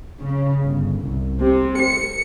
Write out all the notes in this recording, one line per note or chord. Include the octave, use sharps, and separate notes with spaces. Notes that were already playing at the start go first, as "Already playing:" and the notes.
C#3
G1
C2
C3
C#7